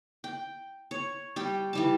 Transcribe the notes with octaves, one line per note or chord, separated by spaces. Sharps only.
G5
C#5
G3 G5
E3 G3 A5